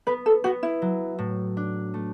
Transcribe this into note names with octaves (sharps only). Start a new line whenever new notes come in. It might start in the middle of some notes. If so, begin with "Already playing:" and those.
B3 B4
A4
B3 F#4
E4
F#3
A2
D4
A3